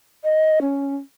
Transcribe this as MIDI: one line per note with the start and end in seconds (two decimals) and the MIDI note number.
0.24 0.59 75
0.61 0.95 61